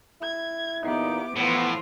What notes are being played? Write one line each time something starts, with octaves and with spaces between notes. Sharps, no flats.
E4 G#6
E2 A#2 B3 D#4 G4 D6
A2 E3 F3 B3 F4